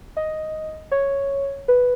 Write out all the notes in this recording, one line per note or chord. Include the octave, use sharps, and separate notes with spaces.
D#5
C#5
B4